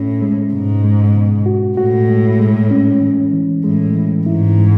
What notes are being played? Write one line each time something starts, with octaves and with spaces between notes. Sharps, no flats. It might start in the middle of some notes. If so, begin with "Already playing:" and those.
Already playing: A2 C#4
G#3
G#2 B2
G#3
B2
F#4
A2 F#4
G#3
G#3
C#4
E3
E3
A2 G#3
E3
G#2 E4
G#3